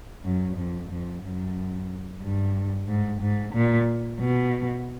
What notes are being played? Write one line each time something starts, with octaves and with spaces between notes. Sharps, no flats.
F#2
F2
F2
F#2
G2
G#2
G#2
A#2
B2